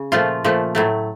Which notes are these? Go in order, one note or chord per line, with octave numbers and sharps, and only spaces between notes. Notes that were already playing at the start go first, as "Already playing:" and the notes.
Already playing: C#3
A#2 F3 A3 F4
A#2 F3 A3
A2 F#3 A3